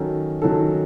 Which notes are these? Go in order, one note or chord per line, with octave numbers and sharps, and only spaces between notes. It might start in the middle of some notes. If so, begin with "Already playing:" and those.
Already playing: D#3 F#3 C#4 F#4 A4
D#3 F#3 C#4 F#4 A4